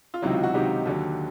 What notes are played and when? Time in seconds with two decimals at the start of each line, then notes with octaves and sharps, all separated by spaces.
0.14 F4
0.22 C#2 C3 D#3 F#3 E4
0.33 F4
0.43 F#4
0.54 C#2 C3 D#3 F#3 G4
0.86 D#2 D3 F#3